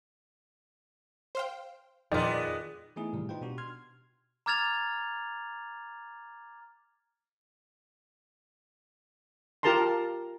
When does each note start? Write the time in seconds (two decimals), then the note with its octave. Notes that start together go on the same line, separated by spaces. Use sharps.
1.35 C5 F5 G5
2.12 F2 A#2 D#3 G#3 B3 F4 D5
2.96 E3 A3 B3 D#4 E4 G#4
3.13 A2 C3 D#3 G3 G#3
3.29 D#4 F4 B4 C5 G5
3.41 B2 D4 F#4 G4
3.58 C6 F6 G#6
4.46 A#5 D6 F6 G#6 A6 F7
9.63 F4 G4 A#4 A5 A#5 C6